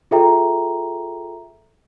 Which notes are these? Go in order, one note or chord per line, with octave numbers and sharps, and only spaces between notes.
F4 G#4 A4 E5 G5 A#5